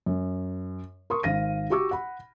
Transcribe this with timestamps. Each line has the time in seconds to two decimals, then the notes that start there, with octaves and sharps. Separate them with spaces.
0.06 F#2
1.10 A#4 C6 C#6 D#6
1.23 G#1 F5 A#6 D#7
1.70 F#4 G4 C#6 D6 E6
1.91 F#5 B5